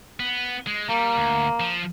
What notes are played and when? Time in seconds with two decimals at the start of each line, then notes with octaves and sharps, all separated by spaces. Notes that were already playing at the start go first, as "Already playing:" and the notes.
0.20 B3
0.67 G#3
0.89 G3 A#3
1.17 D2
1.60 F3